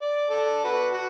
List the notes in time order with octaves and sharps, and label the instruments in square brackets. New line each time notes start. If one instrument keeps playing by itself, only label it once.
[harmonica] D5
A4 D5
F#4 B4
F#4